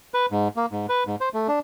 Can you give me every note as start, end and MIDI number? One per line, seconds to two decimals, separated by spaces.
0.14 0.26 71
0.31 0.48 44
0.56 0.66 58
0.72 0.86 44
0.89 1.04 71
1.07 1.16 44
1.21 1.29 72
1.34 1.47 57
1.48 1.59 62